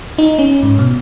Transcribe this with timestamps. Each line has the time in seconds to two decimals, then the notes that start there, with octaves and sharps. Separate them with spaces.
0.18 D#4
0.39 C#4
0.63 G#2
0.79 B2